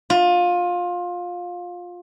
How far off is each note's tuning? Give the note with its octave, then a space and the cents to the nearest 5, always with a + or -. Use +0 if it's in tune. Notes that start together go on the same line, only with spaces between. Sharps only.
F4 +20